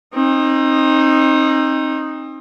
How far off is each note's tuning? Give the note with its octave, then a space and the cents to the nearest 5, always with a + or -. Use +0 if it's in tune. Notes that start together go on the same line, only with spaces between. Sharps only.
C4 +35 D#4 +0